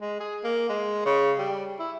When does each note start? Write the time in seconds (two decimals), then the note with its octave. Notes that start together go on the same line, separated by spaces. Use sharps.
0.01 G#3
0.20 G#4
0.44 A#3
0.69 G#3
1.06 C#3
1.39 G3
1.79 E4